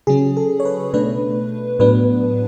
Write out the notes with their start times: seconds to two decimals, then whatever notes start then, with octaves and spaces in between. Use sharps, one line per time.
0.07 C#3 F#3 C#4 G#4
0.37 A4
0.60 C#5
0.65 B4
0.93 B2 A3 D4 B4
1.79 A2 F#3 B3 D4 B4